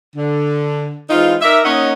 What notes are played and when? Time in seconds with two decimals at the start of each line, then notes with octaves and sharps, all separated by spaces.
0.16 D3
1.10 E3 G#3 C4 D#4 F4
1.41 D#4 A#4 D5 E5
1.63 A#3 C#4 D#4 C#5 D#5 F#5